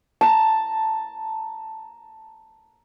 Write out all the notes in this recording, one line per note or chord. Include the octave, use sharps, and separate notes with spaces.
A5 A#5